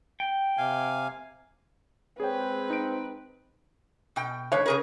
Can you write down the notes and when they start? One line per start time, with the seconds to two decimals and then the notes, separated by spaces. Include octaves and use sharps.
0.20 G5
0.57 C3 F5 G#5
2.20 G#3 C4 G#4 B4 C#5 G5
2.70 D#4 D7
4.16 B2 G5
4.52 A2 D3 C#5
4.66 C#3 G#4 A#4